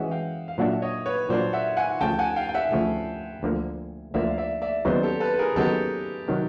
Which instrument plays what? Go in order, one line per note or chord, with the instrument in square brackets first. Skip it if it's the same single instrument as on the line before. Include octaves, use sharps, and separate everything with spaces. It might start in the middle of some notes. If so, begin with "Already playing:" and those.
Already playing: [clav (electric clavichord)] E3 G#3 C#4 F#4 [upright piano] D#5 E5 F#5
[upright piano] F5 G5
F5
[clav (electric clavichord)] A#2 F#3 A#3 D4 [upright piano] E5 F#5
[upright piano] C#5 D#5
B4 C#5
[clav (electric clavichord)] A#2 F#3 A#3 D4 [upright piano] C5 D5
[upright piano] E5 F#5
F#5 G#5
[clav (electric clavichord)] D2 C#3 F3 A3 [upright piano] G5 A5
[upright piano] F#5 G#5
F5 G5
G5
E5 F#5
[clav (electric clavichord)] D2 C#3 F3 A3
D2 D3 F3 A#3
[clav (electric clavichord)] D2 D3 F3 A#3 [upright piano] D5 E5
[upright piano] F5
D5 E5
D5 E5
[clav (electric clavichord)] D#2 C#3 F#3 B3 D#4 [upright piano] C5 D5
[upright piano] G4 A4
A4 B4
B4
G#4 A#4
[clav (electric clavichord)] D#2 C#3 F#3 B3 D#4 [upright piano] G4 A4
[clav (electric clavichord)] C3 D#3 F#3